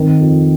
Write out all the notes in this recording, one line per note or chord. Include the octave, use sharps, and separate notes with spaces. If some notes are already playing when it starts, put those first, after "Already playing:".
Already playing: D#3 C4
F2